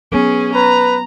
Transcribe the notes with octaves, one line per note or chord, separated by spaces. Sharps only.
F#3 B3 C#4 G#4
B4 A#5